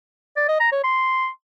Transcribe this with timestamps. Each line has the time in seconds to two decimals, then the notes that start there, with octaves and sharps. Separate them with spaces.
0.37 D5
0.48 D#5
0.60 A#5
0.72 C#5
0.84 C6